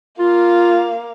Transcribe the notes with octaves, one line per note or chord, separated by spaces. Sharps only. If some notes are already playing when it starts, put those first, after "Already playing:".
A#3 F4 F5